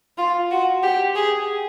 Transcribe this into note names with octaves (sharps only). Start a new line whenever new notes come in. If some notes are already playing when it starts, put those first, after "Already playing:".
F4
F#4
G4
G#4